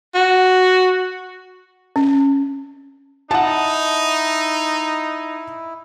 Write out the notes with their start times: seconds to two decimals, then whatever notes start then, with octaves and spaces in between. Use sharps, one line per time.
0.15 F#4
1.96 C#4
3.31 D#4 E4 F#5 A5